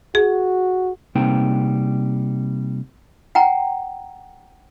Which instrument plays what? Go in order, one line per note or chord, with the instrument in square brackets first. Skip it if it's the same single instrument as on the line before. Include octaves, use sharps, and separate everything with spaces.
[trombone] F#4 [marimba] G#4
[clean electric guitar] C3 G3 A#3 C4 D#4 G5
[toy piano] F#5 G5 A#5